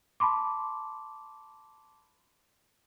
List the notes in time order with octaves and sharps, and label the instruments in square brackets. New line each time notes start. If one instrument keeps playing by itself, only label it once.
[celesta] A5 B5 C6 D6